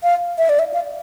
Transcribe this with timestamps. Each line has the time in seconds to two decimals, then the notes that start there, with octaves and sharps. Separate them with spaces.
0.03 F5
0.38 E5
0.49 D5
0.59 E5
0.74 F5